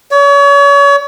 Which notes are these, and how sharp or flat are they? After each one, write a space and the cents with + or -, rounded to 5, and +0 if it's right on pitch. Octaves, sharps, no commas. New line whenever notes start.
C#5 +35